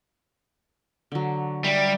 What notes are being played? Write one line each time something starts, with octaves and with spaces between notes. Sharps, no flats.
D3 F#3
G3 E5